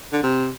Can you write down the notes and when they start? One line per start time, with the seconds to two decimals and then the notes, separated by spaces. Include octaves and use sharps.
0.13 D3
0.23 C3